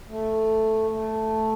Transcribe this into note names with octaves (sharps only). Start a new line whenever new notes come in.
A3
A3